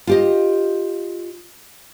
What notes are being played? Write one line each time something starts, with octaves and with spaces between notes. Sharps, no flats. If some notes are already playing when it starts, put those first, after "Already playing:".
F4 G4 D#5